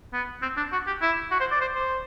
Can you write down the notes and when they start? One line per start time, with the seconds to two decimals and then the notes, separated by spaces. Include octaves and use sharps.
0.13 B3
0.42 C4
0.57 D4
0.72 F#4
0.87 G4
1.02 E4
1.31 F#4
1.40 C5
1.51 D5
1.61 C5
1.75 C5